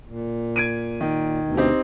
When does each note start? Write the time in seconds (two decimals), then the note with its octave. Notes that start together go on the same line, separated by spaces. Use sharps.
0.08 A#2
0.56 G#6 D7 D#7
1.01 D#3
1.44 D2 B2
1.57 C4 D#4 G4